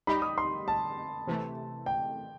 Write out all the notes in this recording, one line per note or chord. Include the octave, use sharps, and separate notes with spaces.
G3 D#4 G4 D#5 B5
D#6
C6
A5
C3 E3 A3
G5